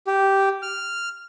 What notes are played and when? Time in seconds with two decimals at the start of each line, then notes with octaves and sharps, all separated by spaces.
0.07 G4
0.62 F6